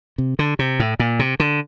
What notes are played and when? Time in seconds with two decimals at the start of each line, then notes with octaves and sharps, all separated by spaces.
0.18 C3
0.39 D3
0.59 C3
0.80 A2
0.99 A#2
1.19 C3
1.40 D3